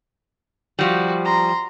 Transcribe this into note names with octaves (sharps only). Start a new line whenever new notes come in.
F3 G3 F#4
A#5 C6